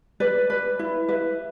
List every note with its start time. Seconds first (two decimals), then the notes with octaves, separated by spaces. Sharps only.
0.20 B4 D5
0.50 B4
0.79 E4
1.09 B4 E5